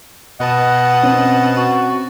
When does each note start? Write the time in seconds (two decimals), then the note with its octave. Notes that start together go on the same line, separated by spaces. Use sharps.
0.40 B2 B4 D#5 F#5 A5
1.03 C4 C#4
1.56 F#4